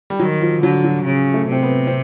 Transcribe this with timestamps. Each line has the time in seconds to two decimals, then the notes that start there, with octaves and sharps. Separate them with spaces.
0.10 G3
0.19 D#3 F#3
0.41 F3
0.62 D3 F#3
0.84 F#3
1.05 C#3
1.34 A3
1.49 C3 C4
1.63 B3
1.87 C4